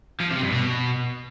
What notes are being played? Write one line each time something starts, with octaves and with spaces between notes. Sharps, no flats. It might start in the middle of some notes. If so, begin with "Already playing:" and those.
F3
C3
G2
B2